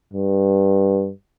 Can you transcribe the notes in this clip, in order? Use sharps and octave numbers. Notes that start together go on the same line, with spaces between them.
G2